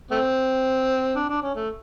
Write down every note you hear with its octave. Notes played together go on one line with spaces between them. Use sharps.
A3 C4
D4
D4
C#4
A3